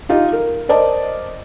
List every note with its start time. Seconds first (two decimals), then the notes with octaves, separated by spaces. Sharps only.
0.09 D#4 F4 G4 D#5
0.33 A#4
0.69 A#4 C5 D5 D#5 A5